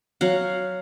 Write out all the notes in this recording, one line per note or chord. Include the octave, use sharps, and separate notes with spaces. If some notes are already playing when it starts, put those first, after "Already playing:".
F#3 F5 F#5